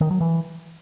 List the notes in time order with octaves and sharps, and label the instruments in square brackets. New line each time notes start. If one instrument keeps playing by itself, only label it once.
[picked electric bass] D#3
F#3
E3